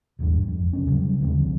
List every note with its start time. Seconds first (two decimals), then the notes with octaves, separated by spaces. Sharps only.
0.19 D#1 G#1 E2 G2
0.48 F2
0.73 E1 C#2 F#2 C#4
0.87 C#3 F#3 G3
1.21 D#2 D3 G#3 C4
1.39 C2 F3